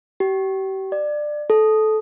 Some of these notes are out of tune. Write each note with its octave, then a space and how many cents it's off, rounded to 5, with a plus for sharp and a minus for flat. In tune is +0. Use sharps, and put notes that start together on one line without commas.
G4 -35
D5 +20
A4 -20